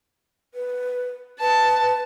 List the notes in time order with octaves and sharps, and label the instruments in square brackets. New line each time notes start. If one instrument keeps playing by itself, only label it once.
[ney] B4
[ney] B4 [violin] A5